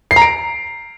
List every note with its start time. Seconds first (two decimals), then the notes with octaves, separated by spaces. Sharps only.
0.11 C7
0.16 A#5
0.22 D7